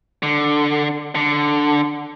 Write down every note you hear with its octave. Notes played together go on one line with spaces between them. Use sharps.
D3
D3